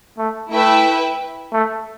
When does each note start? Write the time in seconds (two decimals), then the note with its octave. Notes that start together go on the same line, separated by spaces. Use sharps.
0.18 A3
0.52 A3 E4 B4 E5 G5
1.53 A3